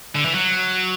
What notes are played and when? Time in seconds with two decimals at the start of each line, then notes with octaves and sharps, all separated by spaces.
0.15 D3
0.25 E3
0.35 F#3